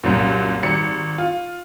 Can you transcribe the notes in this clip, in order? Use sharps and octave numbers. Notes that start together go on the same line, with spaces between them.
C2 F#2 A#2
G#1 G3 C#7
F4